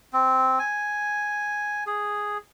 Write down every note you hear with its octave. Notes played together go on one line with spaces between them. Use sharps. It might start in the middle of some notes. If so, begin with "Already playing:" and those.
C4
G#5
G#4